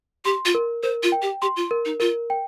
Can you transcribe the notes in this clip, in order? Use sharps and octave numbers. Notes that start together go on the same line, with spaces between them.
G4 C6
F4
A#4
A#4 C5
F4
G5
G4
G4 C6
F4
A#4
D#4
F4 A#4
G5